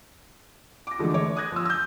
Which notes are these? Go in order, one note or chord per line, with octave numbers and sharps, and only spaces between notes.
D6 A#6
D3 E3 F3 G#3 A3
C#5 D6
D#6 F#6 G#6 A#6
F3 E6
E6 G6